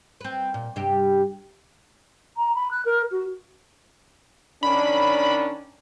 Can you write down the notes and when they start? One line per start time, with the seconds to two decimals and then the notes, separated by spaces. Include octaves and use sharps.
0.21 C4 B4
0.54 A#2
0.76 G2 C3 G4
2.35 A#5
2.54 B5
2.70 F#6
2.85 A#4
3.11 F#4
4.63 D#3 C#4 D4 B5